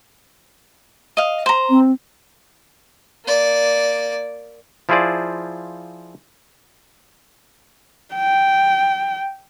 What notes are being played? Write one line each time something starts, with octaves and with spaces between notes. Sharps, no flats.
D#5 F5
C5 A#5
C4
A#3 D5
F3 E4 F4 G#4 C5 D5
G5